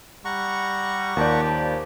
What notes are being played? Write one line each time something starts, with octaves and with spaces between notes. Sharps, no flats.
G3 F#5 A#5 C#6
D#2 A#2 F3 G4 D5 A5